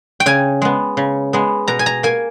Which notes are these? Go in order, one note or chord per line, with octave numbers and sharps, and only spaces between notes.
G5
C#3 G#5
G#3 B3
C#3
G#3 B3
B2 A#5
G#5
A#5
A#3 G#5